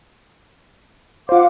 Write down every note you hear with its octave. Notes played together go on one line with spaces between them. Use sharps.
F4 C5 F5 F#5 D6